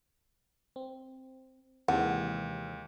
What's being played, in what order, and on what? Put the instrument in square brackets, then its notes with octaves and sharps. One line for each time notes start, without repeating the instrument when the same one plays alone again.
[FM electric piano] C4
[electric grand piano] D#2 [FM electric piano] C3 E3 G#3 [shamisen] F#5